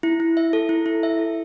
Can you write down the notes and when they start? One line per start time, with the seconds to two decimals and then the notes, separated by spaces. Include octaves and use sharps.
0.03 E4
0.20 E4
0.37 E5
0.53 A4
0.69 E4
0.86 E4
1.03 E5
1.19 A4